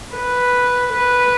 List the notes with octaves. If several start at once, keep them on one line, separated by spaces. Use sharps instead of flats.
B4
B4